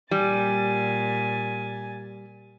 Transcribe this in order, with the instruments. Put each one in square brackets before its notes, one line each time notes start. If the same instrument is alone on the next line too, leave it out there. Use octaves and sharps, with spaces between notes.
[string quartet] A#2 G#5 A6 [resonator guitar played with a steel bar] G3